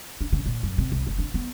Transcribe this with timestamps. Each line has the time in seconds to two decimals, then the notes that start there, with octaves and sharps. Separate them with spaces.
0.21 D4
0.32 C#3
0.46 A#2
0.63 F#2
0.78 C3
0.92 C2
1.07 F#1
1.19 D4
1.34 B3